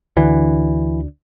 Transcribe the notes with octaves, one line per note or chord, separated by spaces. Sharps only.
D2 D3 E3